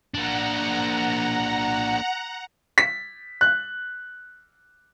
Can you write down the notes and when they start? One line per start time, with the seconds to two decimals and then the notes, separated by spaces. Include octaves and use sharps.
0.14 A#3 D4 F#5 A#5
2.78 B6
3.41 F#6